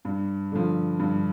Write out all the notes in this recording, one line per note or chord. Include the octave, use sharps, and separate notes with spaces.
G2
D3 F3
G2